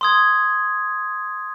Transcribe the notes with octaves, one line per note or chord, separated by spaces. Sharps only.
C6 D#6 G#6